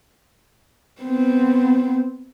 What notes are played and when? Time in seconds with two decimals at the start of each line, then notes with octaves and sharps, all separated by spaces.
1.02 B3 C4